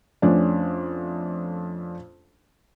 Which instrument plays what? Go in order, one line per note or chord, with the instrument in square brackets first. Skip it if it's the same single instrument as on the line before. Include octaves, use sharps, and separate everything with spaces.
[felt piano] F2 A3 C#4 D4